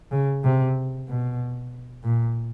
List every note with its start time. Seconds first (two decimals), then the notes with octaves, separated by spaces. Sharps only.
0.12 C#3
0.44 C3
1.08 B2
2.04 A#2